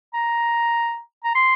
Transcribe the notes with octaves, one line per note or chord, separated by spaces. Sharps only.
A#5
A#5
C6